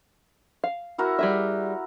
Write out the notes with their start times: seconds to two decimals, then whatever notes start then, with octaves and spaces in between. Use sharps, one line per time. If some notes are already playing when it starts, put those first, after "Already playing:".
0.64 F5
0.98 E4 F#4 A#4
1.19 G3 G#4 E5